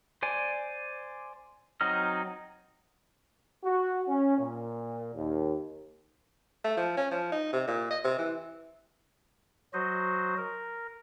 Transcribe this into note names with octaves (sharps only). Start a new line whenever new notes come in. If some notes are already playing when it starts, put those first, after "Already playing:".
C5 D5 G#5
F#3 C4 D#4 D#5 F6
F#4
C#4
A#2
D#2
A3
F3
C#4
F3
D#4
C3
A#2
D#5
C3
E3
F#3 F#4 C5 D#5
A#4